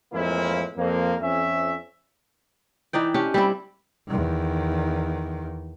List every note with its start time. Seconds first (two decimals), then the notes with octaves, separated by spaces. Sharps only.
0.13 F2 A2 E3 G#3 A#3 E4
0.77 F2 A#3
1.21 F2 C#4 E5
2.93 E3 D#4 D5 G5
3.14 C#4 D4 G4
3.34 G3 C4 E4
4.08 E2 D#3